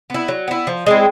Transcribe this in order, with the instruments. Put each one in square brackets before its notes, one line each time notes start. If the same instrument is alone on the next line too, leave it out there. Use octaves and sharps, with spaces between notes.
[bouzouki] B3 E4
F#3
B3 E4
F3
G#3 C4 E4